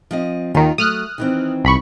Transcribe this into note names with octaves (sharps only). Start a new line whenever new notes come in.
F3 C4 D#5
D#2 D#3 F4
F#3 A3 D#6 F6 F#6
D#3 E3 C4
C2 B5 C#6